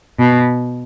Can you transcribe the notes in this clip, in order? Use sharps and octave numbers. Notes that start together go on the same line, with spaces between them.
B2